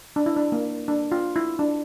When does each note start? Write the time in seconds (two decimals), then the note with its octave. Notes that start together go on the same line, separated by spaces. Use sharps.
0.16 D4
0.26 E4
0.37 D4
0.52 A#3
0.88 D4
1.12 F4
1.36 E4
1.59 D4